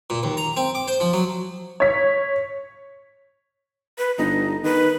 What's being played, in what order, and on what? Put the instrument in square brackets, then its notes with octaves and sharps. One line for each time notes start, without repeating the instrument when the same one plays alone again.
[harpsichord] A#2
D#2
A#5
C4
D6
C5
F3
F#3
[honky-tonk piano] C#5 B6
[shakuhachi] B4
[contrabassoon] G1 [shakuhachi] D#4
[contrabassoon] D#3 [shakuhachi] B4